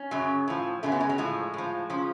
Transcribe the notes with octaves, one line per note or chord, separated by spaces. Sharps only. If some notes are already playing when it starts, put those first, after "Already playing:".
Already playing: C#4
F#2 C#3 F#3
A2 F3
F#2 C#3 F#3 A3
B3
G#3
F#3
A2 F3 G#3
A2 F3
C#3 F3